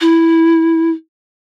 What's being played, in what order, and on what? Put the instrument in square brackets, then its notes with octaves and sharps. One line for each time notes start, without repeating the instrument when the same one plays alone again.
[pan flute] E4